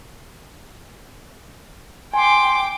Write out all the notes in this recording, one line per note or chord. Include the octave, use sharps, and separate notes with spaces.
G5 G#5 C6 D6